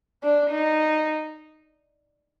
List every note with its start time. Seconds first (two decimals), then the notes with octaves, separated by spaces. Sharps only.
0.23 D4
0.51 D#4